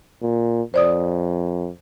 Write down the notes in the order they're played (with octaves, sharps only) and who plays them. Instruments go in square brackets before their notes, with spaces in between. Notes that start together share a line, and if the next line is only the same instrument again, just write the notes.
[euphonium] A#2
[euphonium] F2 [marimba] C5 D5 D#6